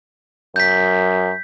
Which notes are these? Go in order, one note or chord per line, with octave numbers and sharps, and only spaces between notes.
F#2 G6 B6